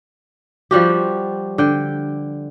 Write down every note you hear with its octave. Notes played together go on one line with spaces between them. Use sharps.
F3 G3 F#4 G4
D3 G5